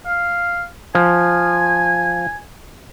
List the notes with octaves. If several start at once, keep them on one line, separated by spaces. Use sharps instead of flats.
F5
F3 G#5